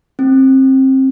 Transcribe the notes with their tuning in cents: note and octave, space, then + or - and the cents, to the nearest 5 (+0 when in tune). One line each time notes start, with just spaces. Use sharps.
C4 +25